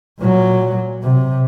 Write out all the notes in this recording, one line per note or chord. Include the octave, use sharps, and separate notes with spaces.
A#2 F#3
C3